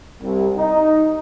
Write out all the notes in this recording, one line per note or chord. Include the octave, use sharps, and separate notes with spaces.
C2
D#4